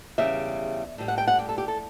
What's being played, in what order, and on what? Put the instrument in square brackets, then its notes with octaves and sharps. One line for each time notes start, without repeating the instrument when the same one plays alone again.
[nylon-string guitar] E2 C#3 G3 E5
A2 G3
F#5
G5
F#5
G4
A4
G4
A4